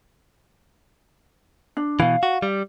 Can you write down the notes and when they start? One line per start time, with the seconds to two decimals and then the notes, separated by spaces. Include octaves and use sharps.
1.77 D4
2.00 B2 E3 F5
2.23 F#4
2.42 G3